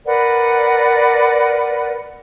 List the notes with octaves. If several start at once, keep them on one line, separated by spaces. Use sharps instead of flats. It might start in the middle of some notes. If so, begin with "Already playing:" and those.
A#4 B4 D5 F#5